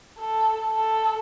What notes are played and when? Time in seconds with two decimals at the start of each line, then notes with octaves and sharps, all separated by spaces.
0.18 A4
0.71 A4